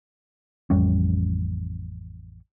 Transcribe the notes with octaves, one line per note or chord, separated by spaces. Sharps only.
A1 F2 G3 C#4